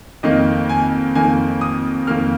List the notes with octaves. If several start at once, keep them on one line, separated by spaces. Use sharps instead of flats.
F2 D#3 A#3 D#5
G#5
F2 D#3 A#3 G#5
D#6
F2 D#3 A#3 F6